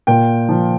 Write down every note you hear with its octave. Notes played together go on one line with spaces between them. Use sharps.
A#2 G5
F3